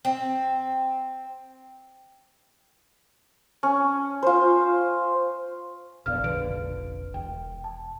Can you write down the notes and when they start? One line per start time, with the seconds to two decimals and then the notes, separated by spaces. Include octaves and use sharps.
0.05 C4
3.63 C#4
4.22 F4 C5
6.06 E1 A#1 B2 D5 F5 F6
6.24 F1 A#1 D3 B4 D7
7.14 E1 G5
7.64 A5